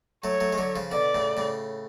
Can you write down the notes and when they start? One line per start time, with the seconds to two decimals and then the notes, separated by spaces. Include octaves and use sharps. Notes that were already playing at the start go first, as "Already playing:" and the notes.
0.24 F#3 A3 C#5
0.40 F#3 A3
0.53 G#3
0.58 D3 F#3
0.76 C#3 F3
0.92 B2 D3 D5
1.15 A2 C#3
1.37 A2 C#3